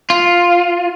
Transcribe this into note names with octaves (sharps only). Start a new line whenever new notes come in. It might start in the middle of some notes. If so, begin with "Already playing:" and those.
F4